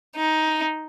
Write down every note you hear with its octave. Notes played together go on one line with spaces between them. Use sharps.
D#4